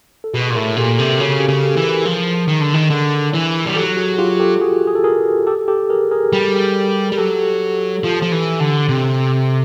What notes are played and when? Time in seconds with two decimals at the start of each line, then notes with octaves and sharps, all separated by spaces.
0.24 A4
0.34 B2 F#4 G#4
0.51 A#2
0.55 A2 G#4 A#4
0.76 A#2 G4 A4
0.98 C3 G4 A4
1.19 C#3 F#4 G#4
1.40 G4 A4
1.48 C#3
1.62 G4 A4
1.76 E3
1.83 G#4 A#4
2.05 F3
2.48 D#3
2.61 D3
2.74 D#3
2.90 D3
3.34 E3
3.66 G3
3.76 F#3 G4 A4
3.97 F#4 G#4
4.19 F4 G4
4.40 G4 A4
4.61 F#4 G#4
4.87 G#4
4.95 A4
5.04 G#4 A#4
5.47 G4 A4
5.68 G4 A4
5.90 G#4 A#4
6.11 G#4 A#4
6.33 G3
7.12 G3
7.18 F#3 G4 A4
8.03 F3
8.22 F3
8.32 E3
8.60 D3
8.89 C3